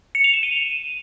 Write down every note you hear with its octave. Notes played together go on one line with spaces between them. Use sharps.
C#7
F7
E7
D#7